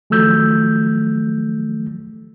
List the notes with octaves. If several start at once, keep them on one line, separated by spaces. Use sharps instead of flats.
D#3 F3 F#3 A3 E6 G6